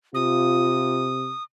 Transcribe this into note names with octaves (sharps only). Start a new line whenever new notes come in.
C3 F4 D#6